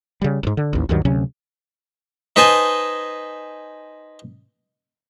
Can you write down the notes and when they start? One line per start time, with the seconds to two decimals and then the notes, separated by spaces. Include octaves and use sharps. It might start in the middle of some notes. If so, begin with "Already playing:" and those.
0.22 C#3 G3
0.43 A1 G#2
0.57 D3
0.73 A1 D#2
0.89 D2 G2 D#3 F#3
1.05 D2 C3 F#3 C#4
2.36 D#4 B4 C5 D#5 G#5 A5